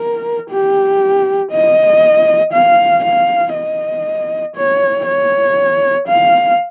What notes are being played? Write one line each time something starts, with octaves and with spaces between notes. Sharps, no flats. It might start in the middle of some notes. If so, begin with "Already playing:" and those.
Already playing: A#4
G4
D#5
F5
F5
D#5
C#5
C#5
F5